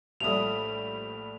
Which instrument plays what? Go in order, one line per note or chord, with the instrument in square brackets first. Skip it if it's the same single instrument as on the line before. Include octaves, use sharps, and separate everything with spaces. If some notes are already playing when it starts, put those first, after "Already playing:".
[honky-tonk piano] A#1 G3 [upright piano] A2 A3 D#6 [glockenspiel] F7